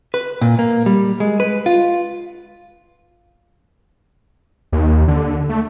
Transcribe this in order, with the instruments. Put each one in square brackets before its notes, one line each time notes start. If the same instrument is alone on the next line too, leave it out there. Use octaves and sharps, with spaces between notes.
[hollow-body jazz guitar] B4
A#2
A#3
G3
G#3
B4
F4
[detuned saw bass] D#2
D3
A3